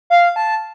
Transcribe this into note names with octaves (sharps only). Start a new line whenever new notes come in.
F5
A5